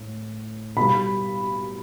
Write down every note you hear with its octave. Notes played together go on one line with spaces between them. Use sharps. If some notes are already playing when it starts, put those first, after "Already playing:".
Already playing: A2
B2 G3 B5